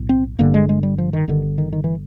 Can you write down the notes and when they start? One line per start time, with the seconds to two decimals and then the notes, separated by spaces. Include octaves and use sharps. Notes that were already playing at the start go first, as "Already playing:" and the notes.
Already playing: B1 A2
0.09 C4
0.39 G1 G2 D3 A#3
0.54 G#3
0.69 G#3
0.83 G3
0.98 F3
1.13 D#3
1.28 G1 G2 D3 D#3
1.58 D#3
1.73 D#3
1.84 E3